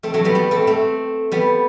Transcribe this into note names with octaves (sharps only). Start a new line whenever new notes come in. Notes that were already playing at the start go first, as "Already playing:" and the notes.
A3 C4
F#3 A3
G3 B3
G3 B3
A3 C4
A3 C4
G3 B3